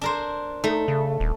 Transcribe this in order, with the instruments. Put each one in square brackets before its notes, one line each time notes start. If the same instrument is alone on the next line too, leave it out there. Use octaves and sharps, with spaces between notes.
[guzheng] D4 A#4 C5
[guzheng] A3 [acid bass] D#4
[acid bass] C#3
D#1